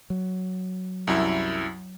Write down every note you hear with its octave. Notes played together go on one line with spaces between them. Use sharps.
F#3
C2 F#2 E4